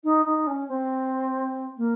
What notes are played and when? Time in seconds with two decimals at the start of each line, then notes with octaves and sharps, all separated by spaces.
0.03 D#4
0.25 D#4
0.47 C#4
0.68 C4
1.77 A#3